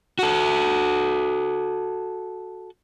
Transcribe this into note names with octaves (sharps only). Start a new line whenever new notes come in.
F#4 A4